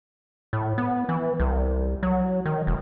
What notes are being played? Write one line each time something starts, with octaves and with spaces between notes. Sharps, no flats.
A2
B3
E3
C2
F#3
D#3
E1